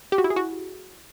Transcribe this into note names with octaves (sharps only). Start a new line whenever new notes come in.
G4
F#4
E4
G#4
F#4